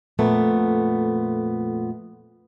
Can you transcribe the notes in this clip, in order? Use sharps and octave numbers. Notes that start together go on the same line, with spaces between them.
F2 A#2 A3 B3